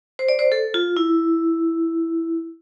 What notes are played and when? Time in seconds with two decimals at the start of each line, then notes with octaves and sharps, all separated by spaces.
0.19 C5
0.28 D5
0.39 C5
0.52 A4
0.74 F4
0.97 E4